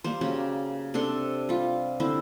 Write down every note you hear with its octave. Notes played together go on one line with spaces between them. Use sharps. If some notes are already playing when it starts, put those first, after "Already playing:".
G3 A#3 C5
C#3 F#3 C#4 G4
C3 D4 A4 C6
G3 F4
D3 C4 E4 C5